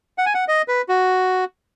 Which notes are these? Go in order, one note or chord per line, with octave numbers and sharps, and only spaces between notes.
F#5
G#5
F#5
D#5
B4
F#4